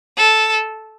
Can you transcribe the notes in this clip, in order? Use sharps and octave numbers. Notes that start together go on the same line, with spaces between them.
A4